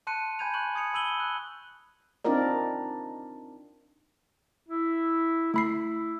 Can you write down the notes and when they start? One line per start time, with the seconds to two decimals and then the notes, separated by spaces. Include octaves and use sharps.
0.07 A5 C6 F#6 C#7 D#7
0.39 G#5 B5 G6 G#6 D#7 F7
0.54 C#6 F#6 F#7
0.75 D#6 G#6 C#7 F7
0.94 B5 E6 D#7 F#7 G7
1.20 F#6
2.25 C4 D4 D#4 F4 A#4 D5
4.69 E4
5.54 A3 E4 B5 C7